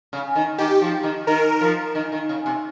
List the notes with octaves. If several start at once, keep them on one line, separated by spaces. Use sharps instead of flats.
C#3
D#3
D#3 G4
F3
D#3
D#3 A#4
F3
D#3
D#3
C#3
C3